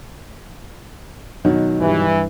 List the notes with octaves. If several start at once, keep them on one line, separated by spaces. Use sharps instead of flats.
B2 D#3 F#3
G2 E3